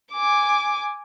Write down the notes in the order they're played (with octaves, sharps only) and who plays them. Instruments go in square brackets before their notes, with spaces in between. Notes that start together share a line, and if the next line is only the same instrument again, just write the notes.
[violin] G#5 D6